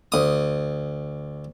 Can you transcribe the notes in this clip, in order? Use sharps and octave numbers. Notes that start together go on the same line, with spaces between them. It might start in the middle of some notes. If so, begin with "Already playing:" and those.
D2 D#6